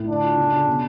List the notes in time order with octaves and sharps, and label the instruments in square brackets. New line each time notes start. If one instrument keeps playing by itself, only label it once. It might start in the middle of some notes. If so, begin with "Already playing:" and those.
Already playing: [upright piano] A2
[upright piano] D3 [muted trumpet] D4
[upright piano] F4
C#3
C#3
B2